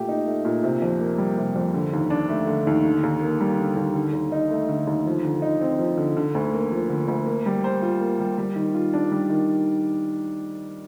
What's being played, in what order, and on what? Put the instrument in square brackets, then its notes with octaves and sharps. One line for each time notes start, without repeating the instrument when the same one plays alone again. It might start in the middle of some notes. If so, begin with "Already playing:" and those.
Already playing: [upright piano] A#2 A3 G4
D#4
A3
A#2
C3
F2
A#3
G3
C3
F2
D3
D#2
D4
A3
D3
D#2
D3
D#2
A#3
G3
D3
D#2
D3
D#2
D#4
A3
D3
D#2
F3
D3
D#4
C4
F3
D3
D3
D2
A#3
F3
D3
D2
A#3
G3
C5
F4
A#3
G3
G3
D#3
F4
D4
G3
D#3